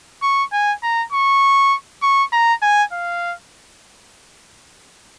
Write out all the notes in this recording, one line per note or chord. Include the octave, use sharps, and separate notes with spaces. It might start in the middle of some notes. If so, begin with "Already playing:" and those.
C#6
G#5
A#5
C#6
C#6
A#5
G#5
F5